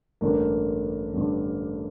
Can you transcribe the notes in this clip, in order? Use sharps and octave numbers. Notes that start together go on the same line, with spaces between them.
A1 G2 D3 A#3 A#4
A1 G2 D3